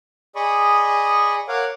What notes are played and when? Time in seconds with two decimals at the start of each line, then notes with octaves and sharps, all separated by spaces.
0.35 G#4 D5 D#5 B5 C#6 D#6
1.48 A#4 C#5 F5 F#5 D6